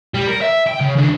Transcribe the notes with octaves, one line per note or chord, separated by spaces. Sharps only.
G3
A#4
E5
G5
C#3
D#2 D4